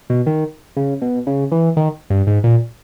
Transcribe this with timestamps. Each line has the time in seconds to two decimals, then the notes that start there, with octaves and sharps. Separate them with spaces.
0.10 B2
0.26 D#3
0.76 C#3
1.02 B2
1.27 C#3
1.52 E3
1.77 D#3
2.10 G2
2.27 G#2
2.44 A#2